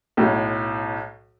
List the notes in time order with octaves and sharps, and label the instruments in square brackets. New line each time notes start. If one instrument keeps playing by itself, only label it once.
[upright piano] B1 A2